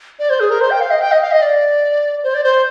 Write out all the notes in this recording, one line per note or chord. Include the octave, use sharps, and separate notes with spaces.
D5
C5
G#4
A#4
C5
G5
F5
D#5
G5
D#5
F5
D#5
D5
C5
D5
C5